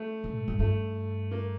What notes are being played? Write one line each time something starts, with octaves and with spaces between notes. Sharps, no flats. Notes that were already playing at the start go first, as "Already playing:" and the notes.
Already playing: A3
D3
G#2
G2
G2 A3
A#3